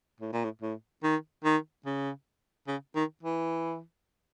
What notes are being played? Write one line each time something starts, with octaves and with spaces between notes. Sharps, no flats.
A2
A#2
A2
A2
D#3
D#3
C#3
C#3
D#3
E3